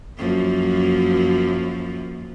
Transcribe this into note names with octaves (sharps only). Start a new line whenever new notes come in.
F#2 F3 A#3